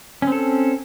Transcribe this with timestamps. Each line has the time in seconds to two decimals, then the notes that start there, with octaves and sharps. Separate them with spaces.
0.22 C#4
0.27 C4
0.32 A4